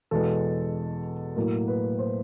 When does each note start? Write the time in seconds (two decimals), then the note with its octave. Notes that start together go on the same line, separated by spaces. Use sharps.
0.11 E2 B2 G#3 A4
1.36 A2 F#3 A#3 A#4
1.68 B4
1.99 C5